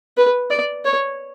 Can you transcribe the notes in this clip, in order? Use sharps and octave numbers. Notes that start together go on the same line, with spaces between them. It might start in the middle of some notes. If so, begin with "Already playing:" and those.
B4
D5
C#5